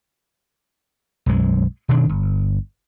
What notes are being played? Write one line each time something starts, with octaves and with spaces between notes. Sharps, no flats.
B1 F#2 G#3
B2 D#3 D4
G1